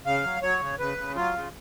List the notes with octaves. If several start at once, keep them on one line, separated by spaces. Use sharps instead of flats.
C#3 F5
F#3
F#3 C#5
C#3
C#3 B4
C#3
F#3 F4
C#3